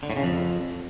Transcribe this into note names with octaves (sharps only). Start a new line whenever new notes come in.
D3
A2
C#3
F2